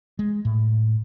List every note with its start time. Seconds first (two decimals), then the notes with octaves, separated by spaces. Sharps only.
0.19 G#3
0.45 A2